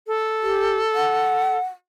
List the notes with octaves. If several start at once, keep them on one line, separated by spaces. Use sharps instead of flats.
A4
G4
F#5